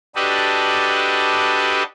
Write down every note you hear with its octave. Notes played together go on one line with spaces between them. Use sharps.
D4 F#4 G4 A4 B4 D#5